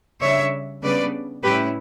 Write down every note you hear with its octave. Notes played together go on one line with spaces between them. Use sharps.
C#3 G3 D4 C#5 E5
C#3 G3 B3 D4 B4 D5
A2 G3 C#4 E4 G4 B4